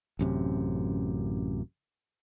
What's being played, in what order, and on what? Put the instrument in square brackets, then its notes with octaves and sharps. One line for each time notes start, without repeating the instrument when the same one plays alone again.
[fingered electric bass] A1 F#2 C3